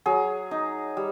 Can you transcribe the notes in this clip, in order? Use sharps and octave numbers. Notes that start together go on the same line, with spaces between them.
F#3 G#4
D#4
G3